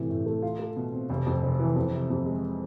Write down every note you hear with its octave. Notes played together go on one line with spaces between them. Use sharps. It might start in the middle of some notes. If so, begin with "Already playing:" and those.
Already playing: A2 C3 E3
A2
A3
F4
A3
B2
C4
F1
F2
F1
E3
F2
C3
F2
G#3